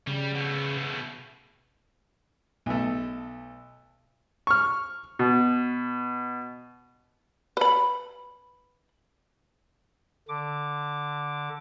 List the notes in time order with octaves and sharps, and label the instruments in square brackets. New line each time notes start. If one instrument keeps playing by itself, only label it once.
[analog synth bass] C#3 [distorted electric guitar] G3
[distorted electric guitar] B2 A3
[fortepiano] B1 A3
C#6 F6
B2
[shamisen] B4 B5
[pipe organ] D3 D6